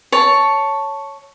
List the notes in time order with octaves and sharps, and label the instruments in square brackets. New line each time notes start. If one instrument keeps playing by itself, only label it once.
[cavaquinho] C#5 A5